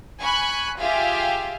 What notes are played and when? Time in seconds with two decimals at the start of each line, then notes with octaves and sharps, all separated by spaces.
0.20 G#5 B5 C#6 F#6
0.78 F4 G4 G#4 E5 F5